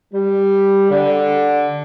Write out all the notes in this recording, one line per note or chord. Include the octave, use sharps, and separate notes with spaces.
G3
D3